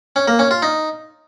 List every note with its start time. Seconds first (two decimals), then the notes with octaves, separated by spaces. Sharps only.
0.16 C#4
0.28 A#3
0.39 C#4
0.51 F4
0.62 D#4